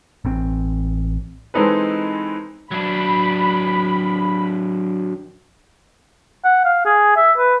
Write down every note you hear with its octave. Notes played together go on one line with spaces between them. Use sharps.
A1 C4
E3 G#3 C4 D#4 A4 B4
F#3 D4 B5
F#5
F5
G#4
E5
B4